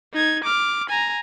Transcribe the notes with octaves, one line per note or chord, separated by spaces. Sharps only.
D#4 G#6
D6 F6
G#5 A#5